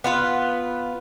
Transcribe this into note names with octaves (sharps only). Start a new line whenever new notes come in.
B3 F4 B4